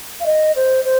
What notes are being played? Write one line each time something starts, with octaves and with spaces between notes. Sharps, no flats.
F5
D#5
C5
C5